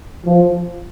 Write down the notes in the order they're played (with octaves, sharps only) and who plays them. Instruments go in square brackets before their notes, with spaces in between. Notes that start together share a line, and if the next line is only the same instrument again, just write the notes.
[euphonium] F3